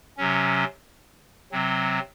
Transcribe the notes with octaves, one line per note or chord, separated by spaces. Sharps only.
C3 F#3 C#4
C3 F#3 C4